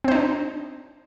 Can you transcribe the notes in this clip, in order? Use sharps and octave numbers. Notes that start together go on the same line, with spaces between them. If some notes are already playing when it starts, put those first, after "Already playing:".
C4 D4 D#4 C5